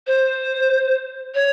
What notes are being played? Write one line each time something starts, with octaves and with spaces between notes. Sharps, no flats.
C5
C#5